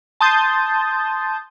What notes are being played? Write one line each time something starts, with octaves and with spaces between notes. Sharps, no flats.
A5 C6 D#6 G6 A6